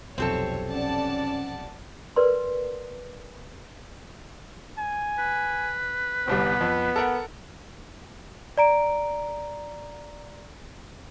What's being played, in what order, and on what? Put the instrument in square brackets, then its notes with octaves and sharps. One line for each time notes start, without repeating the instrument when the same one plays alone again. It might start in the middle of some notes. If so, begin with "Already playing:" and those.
[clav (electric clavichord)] B1 F2 C3 [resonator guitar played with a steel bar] C4 G4 A4 [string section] C#5
[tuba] C#4 [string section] D5 F#5 A5
[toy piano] A#4 B4 D5 C6
[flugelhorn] G#5
[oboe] B4
[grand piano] G1 C2 G3 [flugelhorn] B3
[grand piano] F2
A4 A#4 F#5
[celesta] D5 A#5 D7